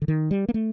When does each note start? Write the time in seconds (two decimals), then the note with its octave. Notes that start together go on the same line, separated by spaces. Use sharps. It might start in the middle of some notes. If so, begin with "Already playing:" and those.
0.02 D3
0.08 D#3
0.31 G3
0.49 A#3
0.54 A3